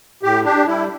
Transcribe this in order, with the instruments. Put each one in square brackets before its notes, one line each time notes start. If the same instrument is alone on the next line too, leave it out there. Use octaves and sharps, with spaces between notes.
[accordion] A2 G4
D4 G4
G3 E4